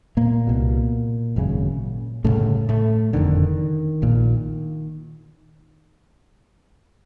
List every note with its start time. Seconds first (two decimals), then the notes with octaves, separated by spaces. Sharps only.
0.17 A#2 A#3
0.47 C2 B2
1.36 G#1 F#2 C#3
2.24 G1 F2 A2 C#3 A3
2.69 A2 A3
3.13 F#1 F2 D3 D#3
4.02 A#1 A#2